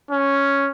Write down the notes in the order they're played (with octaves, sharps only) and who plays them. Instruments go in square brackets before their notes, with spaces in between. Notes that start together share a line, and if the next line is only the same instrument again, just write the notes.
[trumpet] C#4